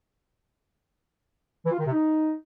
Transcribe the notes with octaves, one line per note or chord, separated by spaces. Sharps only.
E3
F4
D#3
C3
D#4